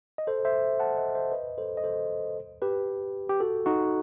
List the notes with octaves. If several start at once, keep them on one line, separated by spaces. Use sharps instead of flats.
D#5
A4 C5
C5 E5
F#5 A5
D#5 F#5
C5 E5
B4 D#5
A4 C5
D#5
A4 C5
G4 B4
G4
F#4 A4
D#4 F#4